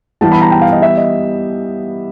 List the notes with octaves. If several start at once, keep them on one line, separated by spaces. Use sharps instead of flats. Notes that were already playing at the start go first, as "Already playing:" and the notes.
E3 G3 B3 E4 G4 A5
B5
A#5
G5
F5
D#5
E5
D#5